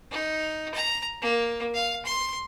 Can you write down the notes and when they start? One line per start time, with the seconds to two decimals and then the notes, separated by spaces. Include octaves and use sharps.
0.11 D#4
0.74 A#5
1.22 A#3
1.74 F5
2.05 C6